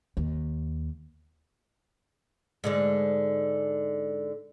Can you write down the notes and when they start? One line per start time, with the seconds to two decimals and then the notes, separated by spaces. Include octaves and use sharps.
0.17 D#2
2.64 G#2 D3 G#3